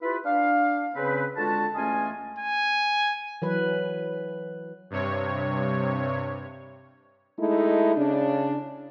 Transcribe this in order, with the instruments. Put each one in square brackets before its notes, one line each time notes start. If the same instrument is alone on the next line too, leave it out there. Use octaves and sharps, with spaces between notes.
[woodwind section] E4 F4 G4 B4
D4 F5
C#3 C4 B4
D3 G#3 F4 F#4 A5
E2 A3 C#4 F4 D#5 G#5
[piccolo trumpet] G#5
[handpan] E3 F#3 B4
[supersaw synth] G2 C3 C#5
[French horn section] G#3 A3 D#4 E4
C#3 D4